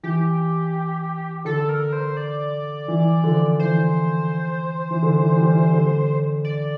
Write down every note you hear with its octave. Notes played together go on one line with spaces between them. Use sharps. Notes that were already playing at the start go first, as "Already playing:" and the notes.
E3 G4
D3 A4
A#4
C5
D5
E3
D3 F3
E3 C5
E3
D3
E3
E3 G3
E3
D3
D5